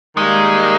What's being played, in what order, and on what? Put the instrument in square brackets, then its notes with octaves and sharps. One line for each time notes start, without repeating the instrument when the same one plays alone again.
[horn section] D#3 G3 A#3 [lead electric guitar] G#3